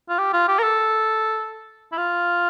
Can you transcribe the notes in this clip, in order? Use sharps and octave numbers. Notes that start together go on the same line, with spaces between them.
F4
G4
F4
G4
A#4
A4
E4
F4